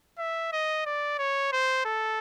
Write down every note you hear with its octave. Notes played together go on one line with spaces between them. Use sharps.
E5
D#5
D5
C#5
C5
A4